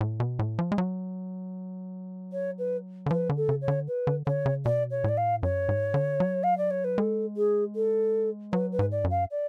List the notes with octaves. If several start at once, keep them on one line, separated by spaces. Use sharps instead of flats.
A2
B2
A2
F3
G#3
F#3
C#5
B4
D3
F3 B4
D3
A4
C#3
C#5
D3
B4
D3
D3 C#5
C#3
B2 D5
C#5
A2 D5
F5
F#2 C#5
G#2
D3
F#3
F5
D5
C#5
B4
G#3 A4
G#4
A4
F#3 B4
B4
G#2
D5
F#2
F5
D5